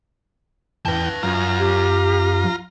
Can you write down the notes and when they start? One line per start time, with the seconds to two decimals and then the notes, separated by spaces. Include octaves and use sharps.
0.85 E2 B4 G5 A5
1.23 F#2 F4 A#5
1.59 G4